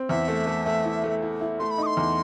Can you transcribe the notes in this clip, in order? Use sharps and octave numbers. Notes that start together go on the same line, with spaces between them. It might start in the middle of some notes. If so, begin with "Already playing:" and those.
Already playing: C4
E2 E5
A3
A3
A3
E4
A3
E4
E4
A3 C6
B5
D#4 D#6
C6
E2